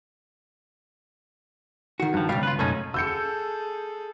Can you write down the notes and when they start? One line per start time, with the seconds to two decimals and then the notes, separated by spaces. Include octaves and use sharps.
2.00 D#3 F#4
2.14 G2 F3
2.29 C#2 G2 B2 G3 F5
2.43 F4 B4
2.59 B1 F#2 A3 C#4 D#4
2.94 G#4 A4 E6 G6 C#7